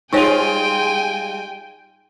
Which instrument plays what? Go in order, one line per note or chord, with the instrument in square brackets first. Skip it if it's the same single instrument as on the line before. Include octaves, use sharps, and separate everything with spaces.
[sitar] G3 G#3 F4 [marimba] D#4 C5 C#5 [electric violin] G5 G#5